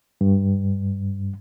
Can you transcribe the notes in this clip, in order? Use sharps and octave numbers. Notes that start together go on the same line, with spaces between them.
G2